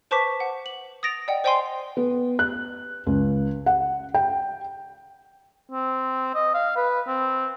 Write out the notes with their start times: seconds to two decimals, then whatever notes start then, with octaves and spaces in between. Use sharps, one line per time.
0.11 B4 C5 A5 C#6 D6 B6
0.40 F#5
0.66 F#7
1.03 D#6 A6 A#6 D7 F7
1.28 D5 D#5 F#5 G5
1.44 C5 D5 G5 G#5 C6 C7
1.97 B3
2.39 F#6
3.07 C#2
3.66 F#5
4.14 G5
5.72 C4
6.35 D#5
6.54 F5
6.76 B4
7.07 C4